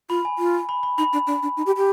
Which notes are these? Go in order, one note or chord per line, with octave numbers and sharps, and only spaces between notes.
F4 B5
G#5
F4
B5
B5
D#4 B5
D4
D4
D4
D#4
G4
G4